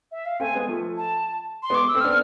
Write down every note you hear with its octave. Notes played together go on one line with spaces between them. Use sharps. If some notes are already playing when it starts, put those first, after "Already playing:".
E5
F5
A3 C4 G#5
G#3 B3
F3 A3
A5
C6
G#3 B3
D6
E6
A3 C4
B3 D4 F6